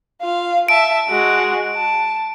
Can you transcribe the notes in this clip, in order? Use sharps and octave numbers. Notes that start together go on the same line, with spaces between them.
F4 F5
E5 A5 D7
G#3 F#4
A5